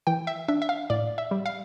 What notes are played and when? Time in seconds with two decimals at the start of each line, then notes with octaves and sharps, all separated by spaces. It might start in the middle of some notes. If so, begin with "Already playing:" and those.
0.07 E3 G5
0.27 E5
0.48 D4 E5
0.62 E5
0.69 F5
0.90 A2 D5
1.18 E5
1.31 G3
1.46 F5